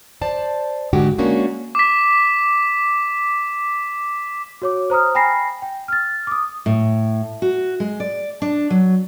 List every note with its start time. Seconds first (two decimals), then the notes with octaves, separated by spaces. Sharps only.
0.21 C5 D5 A5
0.93 G#2 D3 G#3 F#4 G4
1.18 G#3 A#3 C#4 D4 F#4
1.75 D6 B6
4.62 F#4 C#5 D6
4.90 C5 A#5 D#6 F6
5.15 G5 G#5 B5 A#6 C7
5.62 G5
5.88 F6 A6
6.27 D6 D#6
6.66 A2
7.42 F#4
7.80 G#3
8.00 D5
8.42 D4
8.70 F#3